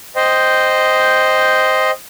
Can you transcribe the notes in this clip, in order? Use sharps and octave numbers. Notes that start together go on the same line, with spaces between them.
C5 D#5 G5